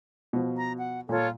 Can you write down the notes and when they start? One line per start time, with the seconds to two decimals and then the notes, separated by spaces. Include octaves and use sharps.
0.33 B2 F3
0.57 A#5
0.78 F#5
1.09 A#2 F4 A4 C#5